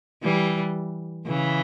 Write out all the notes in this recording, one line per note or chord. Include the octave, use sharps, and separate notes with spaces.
E3 G3
C#3 E3